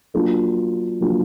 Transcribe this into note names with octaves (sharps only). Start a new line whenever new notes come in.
F#3 A#3 D4 F4
F#3 A#3 D4 F4